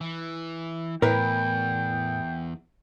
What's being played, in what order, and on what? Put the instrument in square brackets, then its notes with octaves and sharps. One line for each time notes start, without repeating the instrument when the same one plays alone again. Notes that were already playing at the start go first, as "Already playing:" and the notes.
[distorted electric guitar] E3
[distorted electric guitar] E2 [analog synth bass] A2 [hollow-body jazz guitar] A#4 B4 [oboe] G5